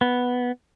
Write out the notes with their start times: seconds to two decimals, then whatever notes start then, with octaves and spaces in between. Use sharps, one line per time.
0.01 B3